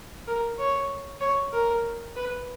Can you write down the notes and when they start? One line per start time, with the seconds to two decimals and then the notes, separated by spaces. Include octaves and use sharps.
0.27 A#4
0.58 C#5
1.21 C#5
1.53 A#4
2.16 B4